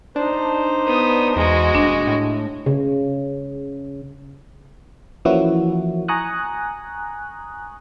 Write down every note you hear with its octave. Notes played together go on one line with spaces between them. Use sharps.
D4 D#4 C5
B3 D#6
E2 G#3 F#4
D#1 D4
A2
C#3
E3 F3 A#3 C#4 E4 F#4
G#5 A#5 C#6 D#6 F#6